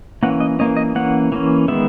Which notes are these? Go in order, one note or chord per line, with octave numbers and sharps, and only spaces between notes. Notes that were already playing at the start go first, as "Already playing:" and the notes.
E3 A#3 C#4 F#5
D#5
E3 A#3 C#4 D#5
D#5
E3 A#3 C#4 F#5
E3 A#3 C#4
D#3 G#3 B3 E5